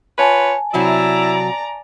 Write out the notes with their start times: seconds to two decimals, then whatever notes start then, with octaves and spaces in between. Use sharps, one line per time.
0.18 F4 B4 C#5 G#5 A5
0.74 C3 F#3 E4 F#4 D5 A#5